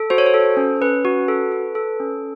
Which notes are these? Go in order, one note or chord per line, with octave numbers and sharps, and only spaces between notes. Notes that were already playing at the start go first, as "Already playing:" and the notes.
Already playing: A4
F#4 C5
C#5
C5
A4
C#4
C#4 B4
F#4
A4
A4
A4
C#4